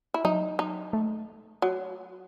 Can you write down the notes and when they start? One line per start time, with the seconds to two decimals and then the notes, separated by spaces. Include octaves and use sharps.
0.14 E4
0.25 F#3 D#4
0.59 D#4
0.93 A3
1.62 F#3